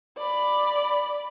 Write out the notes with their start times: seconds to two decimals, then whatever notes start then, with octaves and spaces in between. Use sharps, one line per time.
0.18 D5 B5